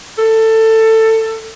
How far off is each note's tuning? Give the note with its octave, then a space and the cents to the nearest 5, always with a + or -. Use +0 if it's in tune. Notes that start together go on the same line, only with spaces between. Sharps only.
A4 +20